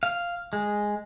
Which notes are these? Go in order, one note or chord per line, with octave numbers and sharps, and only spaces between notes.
F5
G#3